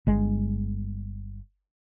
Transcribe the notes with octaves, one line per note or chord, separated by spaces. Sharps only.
G1 G#3